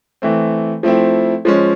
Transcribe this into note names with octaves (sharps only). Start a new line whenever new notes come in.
E3 A3 C4
F3 A3 C4 E4
F3 G#3 C#4